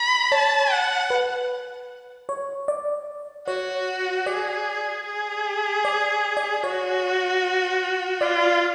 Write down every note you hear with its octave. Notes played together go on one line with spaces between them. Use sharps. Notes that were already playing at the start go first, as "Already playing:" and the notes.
Already playing: B5
C#5 A5
F#5
B4
C#5
D5
F#4 C#5
G#4 D5
G#4
D5
D5
F#4 C#5
F4 D5